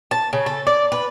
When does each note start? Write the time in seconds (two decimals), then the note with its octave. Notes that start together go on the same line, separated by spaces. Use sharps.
0.11 A5
0.33 C#3
0.46 A4
0.67 D5
0.92 B4